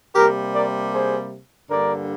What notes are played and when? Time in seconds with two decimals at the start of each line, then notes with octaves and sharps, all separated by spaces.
0.15 C3 G3 A#3 G4 A#4
0.54 A#4 D5
0.93 G#4 C5
1.69 G2 D3 G3 A#3 A#4 D5